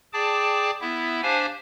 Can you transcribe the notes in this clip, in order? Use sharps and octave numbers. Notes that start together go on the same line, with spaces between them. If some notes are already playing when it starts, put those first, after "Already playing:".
G#4 D5 G5 A5 D6
B3 E4 E5
D4 G4 C5 F5 G#5